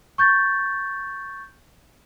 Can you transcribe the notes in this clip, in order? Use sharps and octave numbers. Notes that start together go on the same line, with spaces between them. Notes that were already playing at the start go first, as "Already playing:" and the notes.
C#6 G6 A6